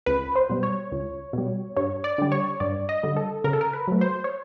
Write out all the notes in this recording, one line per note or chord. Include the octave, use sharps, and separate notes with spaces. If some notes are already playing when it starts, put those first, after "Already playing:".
C#2 B4
C5
B2 G3
C#5
C#2
B2 G3
G2 C#5
D5
D3 G3
C#5
G2 D5
D#5
D3 G3
A4
C#3 A#4
A4
A#4
B4
F#3 A3
C5
C#5